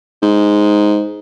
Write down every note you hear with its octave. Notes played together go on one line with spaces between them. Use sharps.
G#2